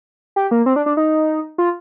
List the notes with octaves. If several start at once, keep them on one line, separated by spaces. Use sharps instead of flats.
G4
A#3
C4
D4
D4
D#4
F4